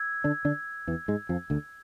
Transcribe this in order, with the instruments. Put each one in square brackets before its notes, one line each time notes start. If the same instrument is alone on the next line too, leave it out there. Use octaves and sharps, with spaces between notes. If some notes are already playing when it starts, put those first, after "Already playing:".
Already playing: [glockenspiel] E6 G#6
[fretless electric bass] D3 D4
D3 D4
E2 E3
G#2 G#3
F2 F3
D2 D3